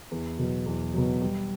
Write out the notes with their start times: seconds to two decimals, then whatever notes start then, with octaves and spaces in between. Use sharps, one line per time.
0.11 E2
0.39 B2 F#3
0.66 E2
0.94 B2 F#3
1.22 G3